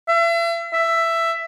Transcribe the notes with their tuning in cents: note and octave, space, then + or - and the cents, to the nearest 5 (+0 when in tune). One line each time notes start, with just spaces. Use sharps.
E5 +40
E5 +10